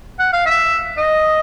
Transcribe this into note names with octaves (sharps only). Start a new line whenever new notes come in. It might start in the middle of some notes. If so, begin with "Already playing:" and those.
F#5
F5
E5
D#5